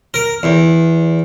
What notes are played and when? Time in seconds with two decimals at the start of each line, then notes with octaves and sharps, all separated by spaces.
0.14 A#4
0.43 E2